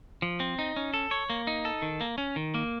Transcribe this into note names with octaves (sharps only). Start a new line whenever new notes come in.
F3
C4
D#4
C#4
A4
C#5
A#3
D#4
A4
D#3
A#3
C#4
D#3
A#3